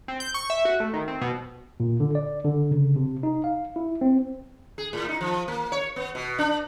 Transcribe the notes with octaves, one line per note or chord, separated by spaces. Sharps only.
C4
G6
C#6
E5
F#4
A3
D#3
C4
B2
A#2
D3
D5
D3
C#3
C3
D#4
F5
E4
C4
G#4
A2
D#4
F3
A#3
C#5
B3
B2
D4